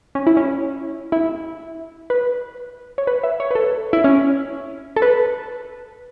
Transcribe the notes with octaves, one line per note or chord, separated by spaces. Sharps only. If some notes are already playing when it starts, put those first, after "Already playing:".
C#4
E4
C#4
E4
B4
C#5
B4
E5
C#5
B4
A4
E4
C#4
A4
B4